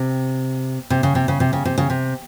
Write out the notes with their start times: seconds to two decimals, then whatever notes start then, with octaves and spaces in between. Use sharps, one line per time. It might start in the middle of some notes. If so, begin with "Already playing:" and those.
Already playing: C3
0.90 C3
1.03 C#3
1.15 C3
1.28 C#3
1.40 C3
1.53 C#3
1.65 C3
1.78 C#3
1.90 C3